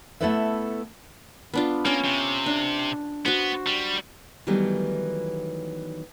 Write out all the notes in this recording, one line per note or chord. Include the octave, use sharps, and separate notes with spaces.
A3 B3 E4 A4 B4 E5
B3 D4 F4
A#3 C#4 F4 C#5
C3
D4
B3 F#4 C5
G3
D#3 E3 F#3 G3 A3 B3